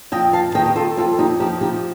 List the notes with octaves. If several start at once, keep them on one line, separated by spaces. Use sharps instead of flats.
F2 D#5 G5
F5 A5
D#3 D#5 G5
G4
F4 A4
F2 F4 A4
D#4 G4
F3 D#4 G4
D#4 G4